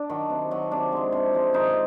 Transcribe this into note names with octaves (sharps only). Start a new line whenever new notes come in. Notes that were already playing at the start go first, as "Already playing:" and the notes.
Already playing: D4
D#3 F#3
C3
D#3 F#3
C3 D4
F3 G#3
C3
F3 G#3
D#3 D#4